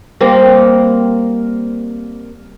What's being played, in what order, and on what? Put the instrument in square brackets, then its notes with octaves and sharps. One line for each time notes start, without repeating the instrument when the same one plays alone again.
[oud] G3 A#3 C4